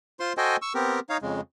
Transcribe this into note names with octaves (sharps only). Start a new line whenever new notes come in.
F4 C5 C6
F#4 A4 C5 D#5 G5 G#5
C#6 E6
B3 C4 G4 A#4
D#4 C#5 F5
F2 C#3 G#3